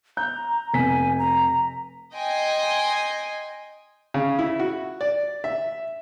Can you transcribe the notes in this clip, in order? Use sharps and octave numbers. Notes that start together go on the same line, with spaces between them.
A#5 G6
F1 G#5 B6
A#5
D#5 G5 G#5 C6
C#3
E4
F#4
D5
E5